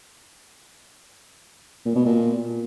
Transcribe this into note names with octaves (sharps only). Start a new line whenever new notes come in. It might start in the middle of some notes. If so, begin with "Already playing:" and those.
A#2
B2
A#2